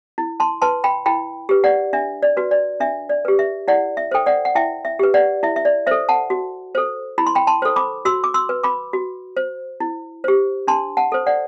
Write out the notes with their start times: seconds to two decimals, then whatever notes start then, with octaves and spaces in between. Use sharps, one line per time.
0.18 E4
0.40 A5 C6
0.62 B4 A5 C6
0.84 G5 B5
1.06 E4 G5 B5
1.49 G4 B4
1.64 D5 F#5
1.93 D4 E5
2.23 D5
2.37 F#4 B4
2.51 D5
2.80 D4 E5
3.09 D5
3.25 G4 B4
3.39 E5
3.68 E4 D5 F#5
3.97 E5
4.11 A4 C5 G5
4.26 D5 F#5
4.45 F#5
4.55 E4 E5 G5
4.85 E5
4.99 G4 B4
5.14 D5 F#5
5.43 E4 E5
5.56 E5
5.65 D5
5.87 A4 C5 E5
6.09 F#5 A5
6.30 F#4
6.75 A4 C5
7.18 E4 B5
7.26 C6
7.35 G5 B5
7.47 A5 C6
7.62 A4 C5
7.76 B5 D6
8.05 F#4 C6 E6
8.24 D6
8.34 C6 E6
8.49 B4
8.64 B5 D6
8.93 F#4
9.37 C5
9.80 E4
10.24 G4 C5
10.67 D4 A5 C6
10.97 F#5 A5
11.12 A4 C5
11.26 D5 F#5